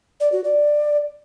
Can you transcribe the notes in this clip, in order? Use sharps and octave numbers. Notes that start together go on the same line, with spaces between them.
D5
F#4
D5